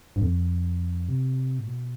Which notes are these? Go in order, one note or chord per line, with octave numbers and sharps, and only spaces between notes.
G2
F2
C3
A2
B2